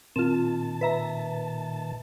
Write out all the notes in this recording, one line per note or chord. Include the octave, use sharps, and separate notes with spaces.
A#2 D#3 C4 F4 A5
B4 E5 A#5